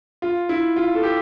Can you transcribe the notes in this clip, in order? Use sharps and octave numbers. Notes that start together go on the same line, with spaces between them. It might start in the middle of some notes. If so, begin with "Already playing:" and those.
F4
E4
F4
A4
G4